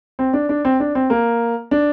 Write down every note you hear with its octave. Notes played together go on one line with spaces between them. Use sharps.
C4
D4
D4
C4
D4
C4
A#3
D4